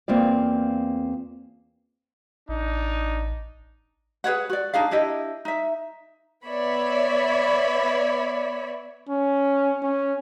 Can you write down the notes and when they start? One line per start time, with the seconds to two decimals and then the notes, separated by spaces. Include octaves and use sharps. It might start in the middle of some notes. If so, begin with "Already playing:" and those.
0.08 E2 A#3 C4 F4 D5
2.49 A1 D4 D#4
4.24 G#4 B4 C#5 F#5
4.50 F#4 D5
4.74 D4 D#4 G#4 F5
4.91 D4 E4 G4 D#5
5.45 D#4 E5
6.47 B3 C#5 D5 E5 B5
9.09 C#4
9.83 C#4